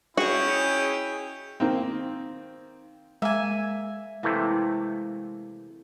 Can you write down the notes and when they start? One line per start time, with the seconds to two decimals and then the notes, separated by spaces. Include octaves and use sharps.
0.17 C#4 E4 F#4 G#4 D#5 G5 C#6
1.60 D#3 A#3 C4
3.22 G#3 A#3 E5 G#5
4.23 C3 E3 A3 A#3